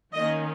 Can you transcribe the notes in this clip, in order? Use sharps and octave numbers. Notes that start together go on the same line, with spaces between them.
D#3 A#3 C#4 D#5